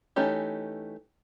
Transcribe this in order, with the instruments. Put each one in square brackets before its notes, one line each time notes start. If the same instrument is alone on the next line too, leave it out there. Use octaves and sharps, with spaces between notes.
[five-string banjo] E3 A3 C#4 D#4 G4